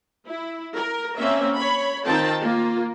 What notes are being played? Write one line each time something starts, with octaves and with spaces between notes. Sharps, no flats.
E4
A#4
A#3 C4 C#4 E5
C#5 B5
D#3 C4 F4 G5 A5
A#3 F4